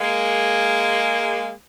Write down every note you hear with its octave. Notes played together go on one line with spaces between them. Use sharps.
G#3 A#3